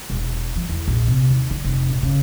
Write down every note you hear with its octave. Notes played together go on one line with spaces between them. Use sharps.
E1
F3
E2
A#1
C3
D#2
D3
F1
A#2
C#3